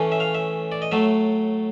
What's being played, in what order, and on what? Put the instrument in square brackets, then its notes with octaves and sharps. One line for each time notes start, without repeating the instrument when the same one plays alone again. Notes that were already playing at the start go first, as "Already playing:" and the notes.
Already playing: [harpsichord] A2 E3 A3 C#4
E5
F5
E5
D5
D#5
A2 F#3 A3 E5